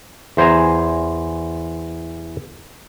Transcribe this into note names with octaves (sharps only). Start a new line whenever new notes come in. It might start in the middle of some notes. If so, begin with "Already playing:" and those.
E2 C5 G#5 A#5